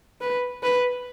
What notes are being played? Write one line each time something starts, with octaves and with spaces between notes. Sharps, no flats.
B4
B4